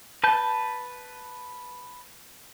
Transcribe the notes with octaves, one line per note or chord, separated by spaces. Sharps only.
B4 A5 G6